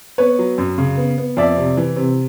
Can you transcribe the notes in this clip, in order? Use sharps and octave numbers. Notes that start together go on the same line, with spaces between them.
B3 B4 C#5
F#3
F#2
C#3
B3
B3
F2 D5 E5
C3
E3
C3